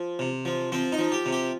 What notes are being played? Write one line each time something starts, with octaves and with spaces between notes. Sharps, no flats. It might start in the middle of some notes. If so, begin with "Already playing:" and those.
Already playing: F3
C3
F3
F3 C4
D#4
F3
G4
C3
G4